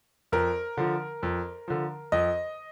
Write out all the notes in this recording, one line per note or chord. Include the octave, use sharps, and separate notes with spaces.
F2 A#4
D3 F3
F2
D3 F3
F2 D#5